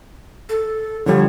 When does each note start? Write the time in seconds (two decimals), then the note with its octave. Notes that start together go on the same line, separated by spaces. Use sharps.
0.49 A4
1.06 D3 F3 G3 C#5